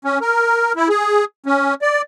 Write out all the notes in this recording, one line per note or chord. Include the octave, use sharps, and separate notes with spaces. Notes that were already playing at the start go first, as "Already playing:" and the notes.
C#4
A#4
E4
G#4
C#4
D5